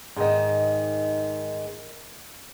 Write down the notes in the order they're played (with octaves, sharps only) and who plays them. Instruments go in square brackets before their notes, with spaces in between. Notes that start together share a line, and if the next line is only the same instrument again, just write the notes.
[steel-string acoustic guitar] G#2 D#3